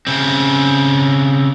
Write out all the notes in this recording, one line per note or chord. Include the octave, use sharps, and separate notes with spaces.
C#3 C4